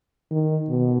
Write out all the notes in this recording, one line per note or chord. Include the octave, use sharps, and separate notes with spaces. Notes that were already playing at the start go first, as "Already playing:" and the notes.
D#3
B2